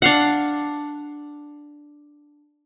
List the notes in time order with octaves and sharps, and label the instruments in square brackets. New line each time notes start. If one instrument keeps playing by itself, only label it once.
[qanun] D4 F5 F#5